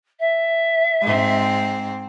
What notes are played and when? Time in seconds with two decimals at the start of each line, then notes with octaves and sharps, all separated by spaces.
0.19 E5
1.02 G#2 C4